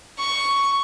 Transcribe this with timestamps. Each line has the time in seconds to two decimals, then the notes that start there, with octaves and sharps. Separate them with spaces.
0.18 C#6